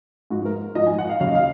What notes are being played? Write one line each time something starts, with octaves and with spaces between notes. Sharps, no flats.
G#2 F3 F#4
A#4
G#2 F3 D#5
G#5
F#5
F5
D#2 C#3 F#3 F5
D#5
F5